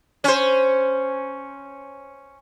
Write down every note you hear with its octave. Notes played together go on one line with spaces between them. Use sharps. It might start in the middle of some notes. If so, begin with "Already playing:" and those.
C#4 C5